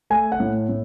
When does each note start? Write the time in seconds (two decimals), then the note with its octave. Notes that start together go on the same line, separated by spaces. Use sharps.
0.10 A3 G#5
0.32 F#5
0.40 A2
0.69 A2